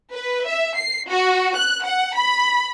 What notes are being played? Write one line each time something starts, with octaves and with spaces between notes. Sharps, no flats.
B4
E5
C7
F#4
F#6
F#5
B5